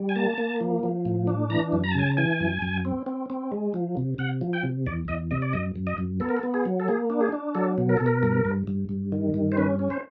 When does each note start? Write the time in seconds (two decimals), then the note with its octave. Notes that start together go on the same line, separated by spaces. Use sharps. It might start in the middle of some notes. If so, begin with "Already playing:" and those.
Already playing: G3
0.09 G#5
0.16 A#3 A5
0.38 A#3
0.61 F3
0.83 F3
1.05 A2
1.27 D4
1.50 E3 A#5
1.72 F#2
1.84 A#5
1.91 A5
1.95 C#3 G#5
2.07 A5
2.17 E3 G#5
2.40 F#2
2.62 F#2
2.85 C4
3.06 C4
3.30 C4
3.52 G#3
3.74 F3
3.97 C3
4.18 C3 F#5
4.41 F3
4.53 G5
4.63 C3
4.86 E2 D5
5.08 E2 D#5
5.31 C3 D#5
5.42 D5
5.53 F#2 D#5
5.76 F#2
5.87 D#5
5.98 F#2
6.20 B3 A4
6.29 A#4
6.37 A4
6.43 B3
6.54 G#4
6.65 F#3
6.80 A4
6.88 A#3 G#4
7.10 D4
7.21 G#4
7.32 D4
7.55 F#3 A4
7.78 B2
7.89 A#4
7.97 B2 A4
8.06 A#4
8.23 G2
8.45 G2
8.67 G2
8.89 G2
9.12 D#3
9.34 G2
9.52 C5
9.57 C#4 B4
9.79 C#4
9.90 C5